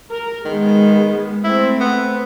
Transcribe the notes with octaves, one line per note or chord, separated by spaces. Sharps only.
A#4
D#3 G#3 B3
A3 C4 E4
B3